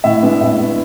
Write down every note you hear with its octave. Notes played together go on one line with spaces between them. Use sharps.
A2 E5
G#3 B3 D4
A2 E5
G#3 B3 D4